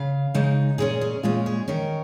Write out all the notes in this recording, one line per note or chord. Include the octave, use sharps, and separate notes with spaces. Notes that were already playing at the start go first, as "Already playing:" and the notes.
Already playing: C#3 F5
C#3 G#3 D#4
A#2 G#3 C#4 G#4
G#4
A#2 G#3 C#4 F4
G#4
D#3 C#4 A#4